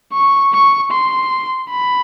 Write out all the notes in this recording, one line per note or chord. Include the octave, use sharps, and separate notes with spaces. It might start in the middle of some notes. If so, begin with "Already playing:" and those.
C#6
C#6
C6
B5